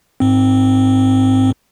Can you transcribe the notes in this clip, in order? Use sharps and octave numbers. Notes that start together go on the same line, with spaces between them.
G#2 C4